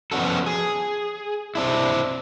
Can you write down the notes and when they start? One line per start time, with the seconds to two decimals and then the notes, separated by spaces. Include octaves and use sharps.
0.12 F3 B3 C#4 F#4 A4
0.46 G#4
1.55 C4 D4 E4